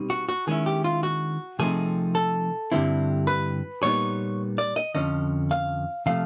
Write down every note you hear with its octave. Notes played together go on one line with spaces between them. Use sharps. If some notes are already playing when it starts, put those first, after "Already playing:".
Already playing: B2 G3 C4 D#4
F#4
F#4
D#3 G#3 C#4 E4 G#4
G4
F4
F#4
C3 F3 A3 C4 D#4 G#4
A4
G2 D3 G3 C4 E4
B4
A#2 G3 B3 D#4 C#5
D5
D#5
F2 D3 F3 C#4 D#5
F5
C3 F3 A3 F5